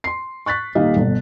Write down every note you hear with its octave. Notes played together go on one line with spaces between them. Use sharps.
C6 C7
C#6 F#6 A6 B6
D#1 D#2 D#3 G4 D#5 F5
G1 B2